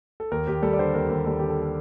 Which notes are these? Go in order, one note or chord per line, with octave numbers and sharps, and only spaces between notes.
A4
D#2 A#4
D#2 G4
G3 A4
D5
D3 C5
D#2 A#4
D#2 A#4
G3 A4
D3 G4
A4
A4